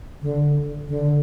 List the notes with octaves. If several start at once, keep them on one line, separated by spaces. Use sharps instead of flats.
D3
D3